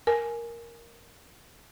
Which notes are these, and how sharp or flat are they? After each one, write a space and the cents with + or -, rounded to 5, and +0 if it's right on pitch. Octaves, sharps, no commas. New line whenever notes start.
A#4 +0 G#5 +10